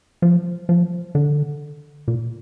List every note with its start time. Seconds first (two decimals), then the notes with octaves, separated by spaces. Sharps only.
0.22 F3
0.69 F3
1.15 D3
2.08 A#2